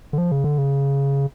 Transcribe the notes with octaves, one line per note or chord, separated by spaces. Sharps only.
D3
F3
C#3
D3
C#3